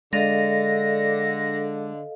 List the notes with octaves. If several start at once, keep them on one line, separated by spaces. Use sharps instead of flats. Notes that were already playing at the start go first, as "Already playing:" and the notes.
D3 G#3 A4 D#5 F5 A#6